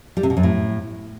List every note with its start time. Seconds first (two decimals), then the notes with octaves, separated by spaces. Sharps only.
0.17 G3
0.23 C3
0.30 B2
0.37 F#2
0.43 A2